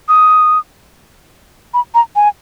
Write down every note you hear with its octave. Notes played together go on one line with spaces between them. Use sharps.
D#6
B5
A#5
G#5